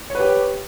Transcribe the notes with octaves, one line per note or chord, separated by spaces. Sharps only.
G4 B4 C#5